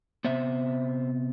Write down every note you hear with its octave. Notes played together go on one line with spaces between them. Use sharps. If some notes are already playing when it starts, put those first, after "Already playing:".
C3 G3 B3 C5 E5